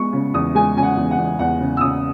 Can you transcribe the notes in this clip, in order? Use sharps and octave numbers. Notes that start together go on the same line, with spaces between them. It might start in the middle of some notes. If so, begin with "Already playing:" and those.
Already playing: G#3 B3 C#6
C#3
E2 D#6
G#3 G#5
C#3 G#5
F#5
E2
F#5
E2
E2 F#5
C#3
E6
C#3 D#6